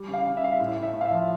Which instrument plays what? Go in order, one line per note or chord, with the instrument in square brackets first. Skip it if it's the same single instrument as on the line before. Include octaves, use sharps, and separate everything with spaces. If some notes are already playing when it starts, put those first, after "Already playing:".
Already playing: [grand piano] G3
C#3
F5
C#3
E5
G3 F5
E5
A2
A2
E5
A2
F5
E5
F3